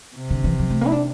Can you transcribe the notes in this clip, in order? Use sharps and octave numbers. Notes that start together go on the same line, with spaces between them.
C3
D3
E3
F3
A3
A#3
E4
D4